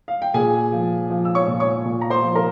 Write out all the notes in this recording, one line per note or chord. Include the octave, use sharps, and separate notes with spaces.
F5
G5
A#2 G#4 G#5
F3
F3
E6
C#5 C#6
A#2
C#5 C#6
A#2
A#5
C5 C6
F3
A#4 A#5